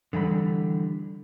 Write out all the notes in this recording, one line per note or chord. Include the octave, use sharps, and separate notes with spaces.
D3 E3 G3 B5